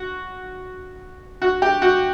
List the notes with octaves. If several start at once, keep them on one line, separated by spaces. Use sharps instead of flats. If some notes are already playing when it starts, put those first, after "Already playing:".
Already playing: F#4
F#4
G4
F#4